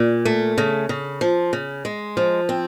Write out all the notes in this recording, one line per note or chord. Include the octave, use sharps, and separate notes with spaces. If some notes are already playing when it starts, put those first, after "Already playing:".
Already playing: A#2
A3
C#3
C#3
F3
C#3
G#3
F3
C4